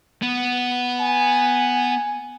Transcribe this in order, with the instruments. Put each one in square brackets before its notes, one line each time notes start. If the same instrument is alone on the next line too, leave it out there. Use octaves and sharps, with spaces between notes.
[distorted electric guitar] B3
[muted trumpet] G#5